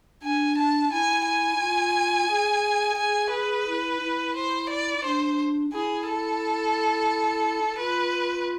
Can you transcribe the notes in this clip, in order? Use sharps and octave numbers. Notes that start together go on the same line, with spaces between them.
D4 G#5
A5
E4 G#5
G#5
F4
G#4
G#4 G#5
G#4 B4
E4
E4
C5
D5
D4 C5
E4 G#4
A4
F4 B4